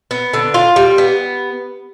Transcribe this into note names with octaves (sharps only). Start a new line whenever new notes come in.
B3
D3
F4
G3
B3